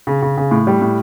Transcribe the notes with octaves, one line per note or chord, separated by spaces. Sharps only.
C#3
C#3
C#3
A2
G3
A2